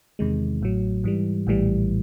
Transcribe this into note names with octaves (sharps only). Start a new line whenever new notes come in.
E2 C3 D#3 G#3
A1 A2 F#3
G#2 E3 G3
A#1 A2 E3 G3